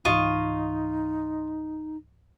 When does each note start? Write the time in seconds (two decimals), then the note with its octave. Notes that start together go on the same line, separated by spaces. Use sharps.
0.05 C#2 G#2 E3 D#4 F4 D#5 C#6